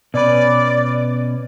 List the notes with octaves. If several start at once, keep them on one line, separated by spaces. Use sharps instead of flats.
B2 C#4 B4 D5